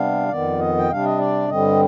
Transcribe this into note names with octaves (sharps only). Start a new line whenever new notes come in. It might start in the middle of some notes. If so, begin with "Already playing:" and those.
Already playing: C3 G3 B3 D4 F5
F2 D#3 B3 D5
D#5
G5
C3 G3 D4 F5
D#5
D5
G2 D3 G3 C4 D#5